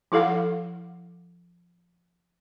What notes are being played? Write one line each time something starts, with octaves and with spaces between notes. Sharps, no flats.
F3 E4 A4 F5 F#5